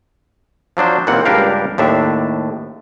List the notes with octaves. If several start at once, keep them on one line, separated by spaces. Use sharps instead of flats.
F3 F#3 D4 C5
D#2 A#2 E3 A#3 C4 F#5
C#2 G2 D4 G4 A#4 F5
D#2 A2 D4 E5